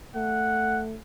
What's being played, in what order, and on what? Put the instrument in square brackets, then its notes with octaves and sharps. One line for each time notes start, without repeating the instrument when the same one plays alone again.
[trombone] A3 [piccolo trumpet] F#5